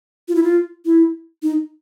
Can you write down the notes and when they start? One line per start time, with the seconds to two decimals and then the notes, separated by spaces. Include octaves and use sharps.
0.28 F4
0.35 E4
0.43 F4
0.85 E4
1.43 D#4